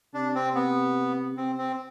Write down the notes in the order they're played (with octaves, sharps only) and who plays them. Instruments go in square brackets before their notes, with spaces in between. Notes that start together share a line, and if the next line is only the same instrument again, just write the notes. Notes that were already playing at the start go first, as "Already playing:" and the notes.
[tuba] C3 [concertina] D4
[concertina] C4
B3
[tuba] C3 [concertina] C4
[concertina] C4